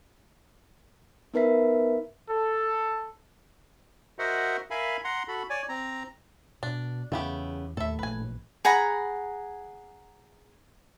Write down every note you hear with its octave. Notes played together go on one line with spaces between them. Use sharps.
B3 D#4 A#4 B4 E5 B6
A4
F#4 A#4 C5 D#5 E5 F#5
A#4 E5 F5 G#5 B5
F#5 A#5 C6
F#4 A4 B5
C#5 D5 G#5
C4 A#5
B2 D4
E2 C#3 A3 B3 G4
D#2 A2 A4 E5
A1 A#2 B4 G#5
G#4 F#5 A#5 B5